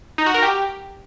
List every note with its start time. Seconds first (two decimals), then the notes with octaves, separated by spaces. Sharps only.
0.18 D#4
0.26 F#4
0.34 A#4
0.42 G4